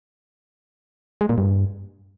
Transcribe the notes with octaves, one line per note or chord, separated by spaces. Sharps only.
G#3
A#2
G2